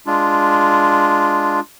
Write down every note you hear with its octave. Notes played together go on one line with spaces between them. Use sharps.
G#3 D4 F4